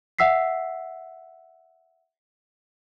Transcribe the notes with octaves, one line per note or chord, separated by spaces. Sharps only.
E5 F#5 E6 B6 C7